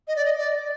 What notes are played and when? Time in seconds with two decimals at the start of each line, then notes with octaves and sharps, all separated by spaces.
0.08 D#5
0.16 D5
0.25 D#5
0.38 D5